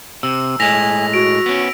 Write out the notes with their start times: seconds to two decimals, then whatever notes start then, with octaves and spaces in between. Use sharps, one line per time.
0.23 C3 E6
0.60 A2 G#3 G#5 A#6 B6 F7
1.14 F#4 D7
1.46 B3 C#4